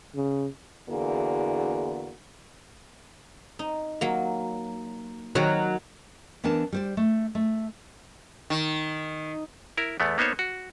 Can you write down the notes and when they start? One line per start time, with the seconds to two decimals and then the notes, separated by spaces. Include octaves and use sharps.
0.15 C#3
0.89 E2 D3 A#3 E4 F#4 G#4
3.59 D#4
4.01 F#3 A#3
5.35 D#3 F#3 F#4 A#4
6.44 E3 B3 D4 A#4 A5
6.72 G3 C5 D5
6.97 A3
7.35 A3
8.50 D#3
9.77 E4 A#4
10.00 E2 A3 B3
10.18 A#3 B3 D#4 C5 C#5
10.39 F#4